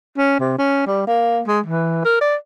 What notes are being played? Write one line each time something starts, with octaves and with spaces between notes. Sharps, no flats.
C#4
C3
C#4
G3
A#3
G#3
E3
A#4
D5